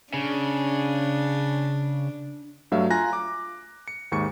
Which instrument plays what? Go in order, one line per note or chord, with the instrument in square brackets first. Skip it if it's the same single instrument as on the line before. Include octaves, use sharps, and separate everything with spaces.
[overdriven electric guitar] C#3 [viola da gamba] D4
[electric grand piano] G2 F#3 A3 E5 F5
F4 G#5 A#5 F#6 A#6
D6
C#7
D#2 G#2 C#6 C#7